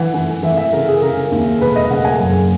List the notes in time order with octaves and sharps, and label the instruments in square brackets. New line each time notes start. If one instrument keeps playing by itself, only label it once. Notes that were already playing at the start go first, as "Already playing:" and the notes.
Already playing: [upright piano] E3 F#5
E3
E3 E5
E5
C#3 A#4
G#4
C#3 A#4
D#2
E1 B4
D#5
C#3 F#5
G#5
F#1